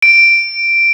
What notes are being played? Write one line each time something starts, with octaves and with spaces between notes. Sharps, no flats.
D7